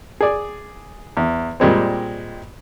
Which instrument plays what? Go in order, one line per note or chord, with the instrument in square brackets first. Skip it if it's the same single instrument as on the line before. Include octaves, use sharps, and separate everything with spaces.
[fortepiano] G#4 D5
E2
A#2 G3 G#3 C4